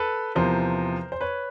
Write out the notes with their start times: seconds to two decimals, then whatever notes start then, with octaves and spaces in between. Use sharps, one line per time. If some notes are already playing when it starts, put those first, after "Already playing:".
Already playing: A4 B4
0.35 E2 C3 F3 A#4 C5
1.12 C5
1.21 B4 C#5